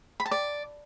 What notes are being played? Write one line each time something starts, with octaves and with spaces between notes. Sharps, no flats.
B5
A5
D5